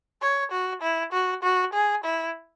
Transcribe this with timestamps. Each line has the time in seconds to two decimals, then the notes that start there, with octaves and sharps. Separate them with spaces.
0.22 C#5
0.52 F#4
0.82 E4
1.13 F#4
1.43 F#4
1.73 G#4
2.04 E4